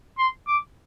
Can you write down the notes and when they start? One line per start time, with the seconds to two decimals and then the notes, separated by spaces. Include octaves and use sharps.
0.19 C6
0.48 D6